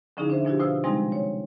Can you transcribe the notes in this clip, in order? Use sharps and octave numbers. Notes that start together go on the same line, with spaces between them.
D3 F3 C#4 D#4 E4 G#4
D4 C5 E5
B2 F3 D4 E4 F#4 G4
B2 F4 C5 F5 E6
C3 F3 G3 G#3 C4 D#4
C#5